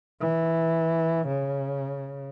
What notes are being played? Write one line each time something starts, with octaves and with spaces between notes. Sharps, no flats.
E3
C#3